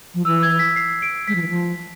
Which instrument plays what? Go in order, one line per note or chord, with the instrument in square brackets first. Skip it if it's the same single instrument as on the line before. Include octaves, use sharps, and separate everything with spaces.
[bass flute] F3
[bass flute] E3 [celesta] E6
[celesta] G#6
B6
C7
D7
[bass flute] G#3 [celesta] B6
[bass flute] F3
E3
F3